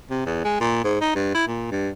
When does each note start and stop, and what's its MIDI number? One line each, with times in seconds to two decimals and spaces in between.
0.10 0.23 48
0.26 0.40 40
0.44 0.55 56
0.61 0.81 46
0.84 0.97 44
1.01 1.14 63
1.15 1.33 43
1.34 1.45 64
1.48 1.67 46
1.72 1.89 43